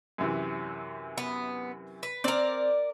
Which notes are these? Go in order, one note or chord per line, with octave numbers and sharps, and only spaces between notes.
F#2 C3 E3
B3
B4
C4 A#4 D5